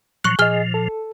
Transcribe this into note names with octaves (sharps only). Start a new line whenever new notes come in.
A#2 F3 F#3 C#6 F#6
A#2 F3 G#4 D#5 F6 G7
A4